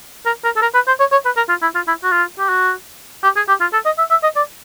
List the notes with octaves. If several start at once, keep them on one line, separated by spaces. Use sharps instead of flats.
A#4
A#4
A4
A#4
B4
C5
C#5
C#5
B4
A#4
F4
E4
F4
E4
F#4
F4
G4
F#4
G4
G#4
G4
F4
A4
D#5
E5
E5
D#5
D5